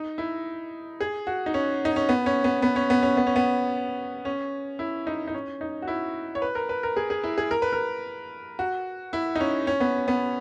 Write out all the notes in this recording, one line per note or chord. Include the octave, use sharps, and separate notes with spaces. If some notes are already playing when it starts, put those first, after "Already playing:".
Already playing: D#4
E4
G#4
F#4
D#4
C#4
D#4
C#4
B3
C#4
B3
B3
C#4
B3
C#4
B3
C#4
B3
C#4
E4
D#4
D#4
C#4
D#4
F#4
E4
C#5
B4
A#4
B4
A#4
G#4
G#4
E4
G#4
A#4
B4
A#4
F#4
E4
D#4
C#4
C#4
B3
B3